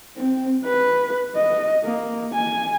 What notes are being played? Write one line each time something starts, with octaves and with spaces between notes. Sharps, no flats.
C4
B4
D#5
A#3
G#5